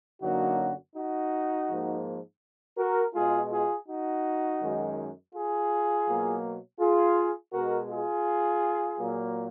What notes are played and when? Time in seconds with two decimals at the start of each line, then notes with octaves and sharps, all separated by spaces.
0.21 F#2 D3 F#3 A#3 D#4 F#4
0.94 D#4 F#4
1.67 G#2 F3 A#3
2.77 F#4 A#4
3.14 B2 G#3 F4 G#4
3.50 F4 G#4
3.87 D#4 F#4
4.60 F#2 D#3 G#3
5.33 F4 G#4
6.06 B2 F#3 A#3
6.80 F4 G#4
7.53 B2 G#3 F#4 A#4
7.89 F4 G#4
8.99 A#2 F#3 A#3